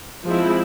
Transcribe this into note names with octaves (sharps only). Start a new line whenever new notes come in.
F3 G#3 C4 E4